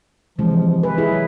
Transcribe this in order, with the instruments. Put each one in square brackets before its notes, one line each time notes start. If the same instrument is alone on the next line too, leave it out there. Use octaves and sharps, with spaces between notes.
[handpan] C3 E3 G#3 [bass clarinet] F3
[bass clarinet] E3 [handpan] B4
[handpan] E4 G#4
[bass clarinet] F#3